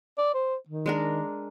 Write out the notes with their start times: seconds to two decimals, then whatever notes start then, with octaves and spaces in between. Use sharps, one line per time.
0.18 D5
0.34 C5
0.68 D#3
0.86 G#3 D4 A#4